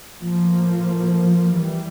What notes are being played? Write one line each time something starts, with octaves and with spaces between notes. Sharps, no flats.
A2 F3 A#3
E3 G3